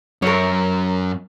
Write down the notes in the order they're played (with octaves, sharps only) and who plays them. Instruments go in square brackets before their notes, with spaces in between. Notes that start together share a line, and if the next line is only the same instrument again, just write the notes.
[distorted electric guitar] F#2 [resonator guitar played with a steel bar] A#4 C#5